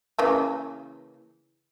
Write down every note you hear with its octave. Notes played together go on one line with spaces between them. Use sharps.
C#3 E3 A#3